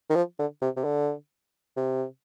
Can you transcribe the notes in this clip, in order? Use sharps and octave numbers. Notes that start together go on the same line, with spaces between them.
D#3
F3
D3
C3
C3
D3
C3